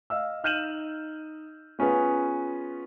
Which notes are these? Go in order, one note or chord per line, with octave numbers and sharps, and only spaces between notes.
D#5 F5 E6
D#4 F6 G6 D#7 E7 F#7
B3 C#4 F4 G#4 B4